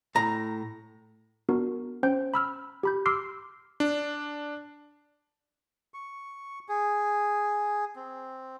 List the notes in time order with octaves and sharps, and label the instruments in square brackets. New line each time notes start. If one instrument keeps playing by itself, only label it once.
[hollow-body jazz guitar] A2 A#5
[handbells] B3 D4 F#4 A#4
C#4 C5 G5 G6
B5 E6 F6
G4 B5 G6
C6 D6 E6 F6 C7
[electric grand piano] D4
[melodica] C#6
G#4
C4